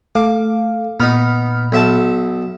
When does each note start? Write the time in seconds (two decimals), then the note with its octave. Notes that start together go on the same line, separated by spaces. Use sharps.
0.15 A3 A4 F5 D6
1.00 A#2 B3 D#4 B5 F6
1.72 B1 E5 A5